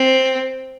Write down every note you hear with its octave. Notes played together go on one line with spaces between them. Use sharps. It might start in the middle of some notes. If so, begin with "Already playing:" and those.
Already playing: C4